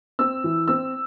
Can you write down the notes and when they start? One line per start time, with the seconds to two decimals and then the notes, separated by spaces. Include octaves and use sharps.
0.19 C4 E6
0.44 E3
0.68 C4 E6